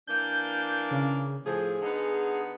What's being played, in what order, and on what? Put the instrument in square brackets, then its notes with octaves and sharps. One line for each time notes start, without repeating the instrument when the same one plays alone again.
[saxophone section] E3 A#3 D4 [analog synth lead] G6
[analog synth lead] C#3
[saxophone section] A2 F3 [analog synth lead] G#4
[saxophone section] D3 B3 D#4